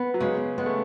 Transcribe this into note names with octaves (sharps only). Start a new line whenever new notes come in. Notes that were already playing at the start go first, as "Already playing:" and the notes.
Already playing: B3
F#3
C#3 G#3
G#3 B3
A3